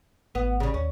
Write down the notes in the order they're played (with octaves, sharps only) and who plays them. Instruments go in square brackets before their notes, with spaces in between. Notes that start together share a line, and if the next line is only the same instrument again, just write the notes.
[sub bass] G#1 [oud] B3
[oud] C#3 G3
[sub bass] D#2 [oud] C#4